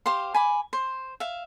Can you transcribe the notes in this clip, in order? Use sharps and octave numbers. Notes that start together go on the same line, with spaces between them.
G4 C5 F5 C6
G#5 B5 D6
C5
E5 F5